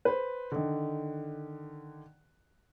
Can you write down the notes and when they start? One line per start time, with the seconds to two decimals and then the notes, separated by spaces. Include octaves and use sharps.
0.05 B4 C5
0.52 D3 D#3